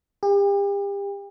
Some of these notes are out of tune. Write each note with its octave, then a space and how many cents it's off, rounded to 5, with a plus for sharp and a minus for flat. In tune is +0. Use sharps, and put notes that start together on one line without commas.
G4 +35